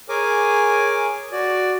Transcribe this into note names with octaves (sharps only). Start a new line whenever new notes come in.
G#4 A#4 C#5 G#5 D6
F#4 D5